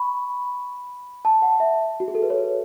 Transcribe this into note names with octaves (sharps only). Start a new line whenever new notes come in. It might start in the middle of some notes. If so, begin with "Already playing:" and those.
Already playing: B5 C#6
A5
F#5
E5
F#4
G#4
A4
B4
C#5